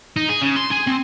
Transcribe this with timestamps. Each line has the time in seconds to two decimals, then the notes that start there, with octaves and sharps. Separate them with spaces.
0.16 D#4
0.29 G#4
0.42 C#3
0.56 C6
0.71 G#4
0.87 C4